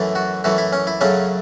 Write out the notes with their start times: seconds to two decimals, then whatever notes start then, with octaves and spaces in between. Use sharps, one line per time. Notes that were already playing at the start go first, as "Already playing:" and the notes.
Already playing: F#2 E3 A3
0.15 F#4
0.44 F#2 E3 A3 F#4
0.58 E4
0.73 C#4
0.87 E4
1.01 F#2 C#3 F#3 A3 C#4